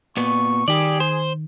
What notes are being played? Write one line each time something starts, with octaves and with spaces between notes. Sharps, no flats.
A#2 B3 C#6
D#3 G4 G#4 D5
C5